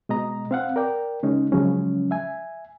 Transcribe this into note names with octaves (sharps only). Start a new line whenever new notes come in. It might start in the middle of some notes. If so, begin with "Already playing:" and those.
B2 G#3 D#5 A#5
C4 F5 F#5
A#4 D5 G5
C#3 G#3 C#4 D#4
C#3 F3 F#3 G#3 C#4
E5 G#5